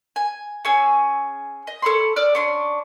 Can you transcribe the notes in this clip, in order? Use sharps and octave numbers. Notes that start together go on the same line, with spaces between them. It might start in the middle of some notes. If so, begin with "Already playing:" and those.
G#5
C#4 G#4 G#5 E6
D#5
A4 C#5 B5 C6
D5 E6 F6
C#4 D4 C6